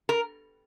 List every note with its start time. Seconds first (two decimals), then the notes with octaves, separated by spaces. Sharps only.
0.09 A#4